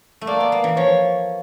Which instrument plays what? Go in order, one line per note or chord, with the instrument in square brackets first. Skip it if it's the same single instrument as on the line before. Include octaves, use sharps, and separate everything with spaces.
[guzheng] A3
[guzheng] A#3 [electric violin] D5
[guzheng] B3
A#3
E3
[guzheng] F3 [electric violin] C#5